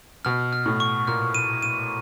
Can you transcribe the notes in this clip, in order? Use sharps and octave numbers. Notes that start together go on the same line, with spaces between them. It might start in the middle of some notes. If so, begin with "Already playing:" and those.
B2 F6
F6
A2
C#6
A#2 F6
D#7
D#7